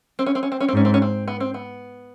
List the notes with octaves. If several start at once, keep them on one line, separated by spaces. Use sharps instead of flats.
C4
C#4
C4
C#4
C4
C#4
C4
G#2 C#4
C4
C#4
C4
B3
C4
B3